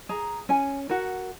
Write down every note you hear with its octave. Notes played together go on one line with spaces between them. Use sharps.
G#4 A#5
C#4 G#5
F#4 A#4 F#5